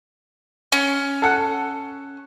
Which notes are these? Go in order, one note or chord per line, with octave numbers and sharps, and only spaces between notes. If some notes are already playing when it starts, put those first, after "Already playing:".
C#4
A4 F#5